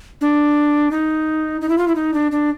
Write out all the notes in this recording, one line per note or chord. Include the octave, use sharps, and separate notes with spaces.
D4
D#4
D#4
E4
F4
E4
D#4
D4
D4